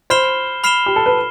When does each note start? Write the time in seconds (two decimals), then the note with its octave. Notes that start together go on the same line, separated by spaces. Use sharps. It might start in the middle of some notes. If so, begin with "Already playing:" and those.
0.10 C5 B5 F6 C7 E7 G7
0.64 B5 F6 C7 E7 G7
0.86 G4
0.96 A4
1.06 B4